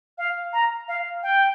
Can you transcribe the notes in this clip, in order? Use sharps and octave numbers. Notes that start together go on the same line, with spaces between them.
F5
A#5
F5
G5